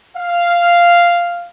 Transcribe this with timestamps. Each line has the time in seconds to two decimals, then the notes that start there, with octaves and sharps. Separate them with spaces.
0.16 F5